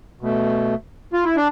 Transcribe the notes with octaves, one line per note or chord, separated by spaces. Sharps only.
B2 A3
F4
E4
D4